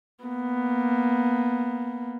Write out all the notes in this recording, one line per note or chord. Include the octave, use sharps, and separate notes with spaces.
A#3 B3